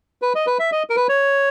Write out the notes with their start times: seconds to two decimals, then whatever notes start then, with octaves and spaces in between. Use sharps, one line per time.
0.22 B4
0.35 D#5
0.47 B4
0.59 E5
0.72 D#5
0.90 A#4
0.96 B4
1.09 C#5